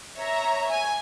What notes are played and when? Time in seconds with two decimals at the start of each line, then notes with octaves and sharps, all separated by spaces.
0.16 C#5 E5 A#5
0.69 G#5